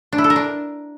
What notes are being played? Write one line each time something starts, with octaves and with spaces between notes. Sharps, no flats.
D4
E4
A4
A#4
D4